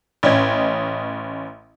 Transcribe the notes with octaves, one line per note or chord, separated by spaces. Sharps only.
A1 C#4 D#5 G#6